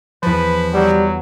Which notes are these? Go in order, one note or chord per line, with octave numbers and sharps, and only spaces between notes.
E2 F3 B4 C6 A6
F#3 G3